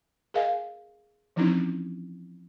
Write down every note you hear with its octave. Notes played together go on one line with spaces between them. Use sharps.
G#4 A#4 D#5 F5 G#5
E3 F3 C4 C#4 D#4 E4